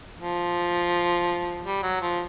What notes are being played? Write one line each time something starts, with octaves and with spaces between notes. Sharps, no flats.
F3
G3
F#3
F3